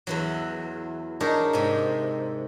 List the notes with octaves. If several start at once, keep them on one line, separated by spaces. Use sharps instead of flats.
E2 E3 F#3
D4 D#4 G4 G#4 A#4 C#5
G#2 C3